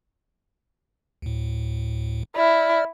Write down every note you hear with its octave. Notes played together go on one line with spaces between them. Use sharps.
D2 A2
E4 D5 F6